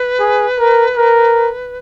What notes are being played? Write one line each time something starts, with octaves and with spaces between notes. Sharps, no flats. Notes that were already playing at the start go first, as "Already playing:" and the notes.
Already playing: B4
G#4
A#4
A#4